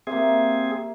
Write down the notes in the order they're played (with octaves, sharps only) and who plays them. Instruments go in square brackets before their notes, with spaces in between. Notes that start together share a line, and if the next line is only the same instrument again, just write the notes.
[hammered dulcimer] A#3 G4 E5 [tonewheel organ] C4 G#4